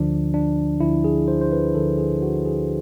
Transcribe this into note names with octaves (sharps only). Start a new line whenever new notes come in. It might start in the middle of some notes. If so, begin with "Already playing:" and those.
Already playing: D2 D3 F3 D4
D4
D2 D3 F3 E4
G#4
C5
C5
B4
D2 D3 F3 A4
G#4
F#4
G#4